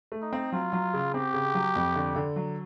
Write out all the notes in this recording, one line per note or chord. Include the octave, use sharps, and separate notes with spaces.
A3
D#4
C4
F#3 F4
F#3
C#3
C4 G4
C#3
F#3
F2
D3
D3
F#3